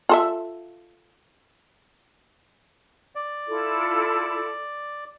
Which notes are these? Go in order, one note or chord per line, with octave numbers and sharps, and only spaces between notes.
F4 A4 E5
D5
E4 F4 A4